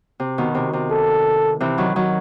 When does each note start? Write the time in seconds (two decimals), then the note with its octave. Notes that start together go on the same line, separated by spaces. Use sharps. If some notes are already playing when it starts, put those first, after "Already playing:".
0.20 C3
0.38 B2 D#3
0.55 C3
0.73 C3
0.91 A4
1.60 C3 E3
1.78 D#3 F#3
1.96 D#3 F#3